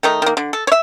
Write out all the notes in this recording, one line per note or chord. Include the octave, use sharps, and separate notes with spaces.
D#3 A3 D#4
D#3 A#3
D3
A4
C#5 E5